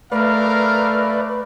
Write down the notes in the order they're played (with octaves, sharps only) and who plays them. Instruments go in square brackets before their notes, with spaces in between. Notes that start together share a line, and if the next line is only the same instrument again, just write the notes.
[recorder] A3 [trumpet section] A#4 F5 [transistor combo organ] B4 D5